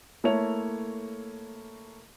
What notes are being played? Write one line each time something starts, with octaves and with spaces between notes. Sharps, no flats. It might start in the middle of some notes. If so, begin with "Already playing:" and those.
A3 A#3 E4 A4 C#5 F7